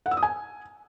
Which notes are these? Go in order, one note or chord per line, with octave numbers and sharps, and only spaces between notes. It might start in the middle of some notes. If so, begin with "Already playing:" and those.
F#5
E6
D#6
G#5